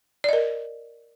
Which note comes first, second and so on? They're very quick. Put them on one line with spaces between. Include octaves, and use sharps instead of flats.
D5 D#5 A#4